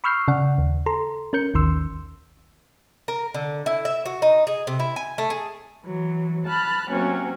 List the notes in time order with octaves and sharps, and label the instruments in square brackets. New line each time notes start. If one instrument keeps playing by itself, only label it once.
[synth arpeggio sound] B5 C#6 E6 F6 G6 C7
C#3 D5 F#5
D#2
A4 A#5 C6
C#4 A#4 G6 C#7
A1 D#2 D#3 C6 E6
[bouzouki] A#4
D3
E4
E5
F#4
D#4
G#4
C3
E4
G#5
A3
G#4
[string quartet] E3 F#3
A5 B5 F6 F#6
C3 F#3 A#3 C#4